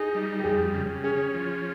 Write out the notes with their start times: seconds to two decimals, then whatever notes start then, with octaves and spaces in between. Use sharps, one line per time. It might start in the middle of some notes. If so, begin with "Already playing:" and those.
Already playing: D#4 G#4
0.15 G3
0.40 G4
0.44 F2 G#4
0.74 C#3
1.04 C#4 G#4
1.34 F3